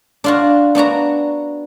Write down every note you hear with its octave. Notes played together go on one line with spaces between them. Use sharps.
D4 F4 F#4
B3 D4 F#4 A#5